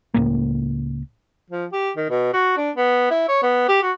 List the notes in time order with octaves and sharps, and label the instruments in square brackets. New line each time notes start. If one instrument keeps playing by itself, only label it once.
[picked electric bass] C#2 A2 A#3
[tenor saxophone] F3
G4
D#3
B2
F#4
D4
B3
E4
C#5
B3
G4
F#4